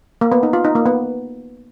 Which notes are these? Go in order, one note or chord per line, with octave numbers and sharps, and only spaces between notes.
A#3
B3
D#4
F4
D#4
A#3
B3